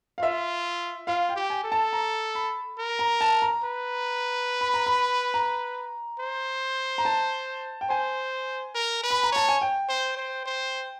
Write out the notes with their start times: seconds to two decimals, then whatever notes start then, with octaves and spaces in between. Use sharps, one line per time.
0.18 F5
0.22 F4 E5
1.07 F4 F5
1.29 G5
1.36 G4
1.50 G#5
1.64 A4
1.72 A5
1.93 A#5
2.35 B5
2.78 A#4
2.99 A#5
3.21 A5
3.42 A#5
3.64 B4
4.61 B5
4.74 A#5
4.86 B5
5.34 A#5
6.19 C5
6.98 A#5
7.05 A5
7.81 G5
7.90 C5 G#5
8.75 A#4
9.03 B4
9.10 B5
9.23 A#5
9.32 C#5 A5
9.49 G#5
9.61 G5
9.89 C5
10.17 C5
10.46 C5